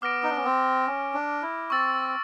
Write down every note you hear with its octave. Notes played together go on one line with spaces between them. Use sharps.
B3 D6 F6 A#6 D7
D#4
D4
C#4
C4
C#4
D4
E4
C4 C#6 E6 A6